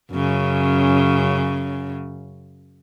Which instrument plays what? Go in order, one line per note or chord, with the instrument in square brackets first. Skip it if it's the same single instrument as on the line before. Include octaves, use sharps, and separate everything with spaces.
[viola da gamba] F#2 C#3